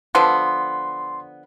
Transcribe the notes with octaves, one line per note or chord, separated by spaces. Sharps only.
D3 F3 B3 C6